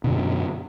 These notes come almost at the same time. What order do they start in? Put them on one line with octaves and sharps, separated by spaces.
B2 D3 F#2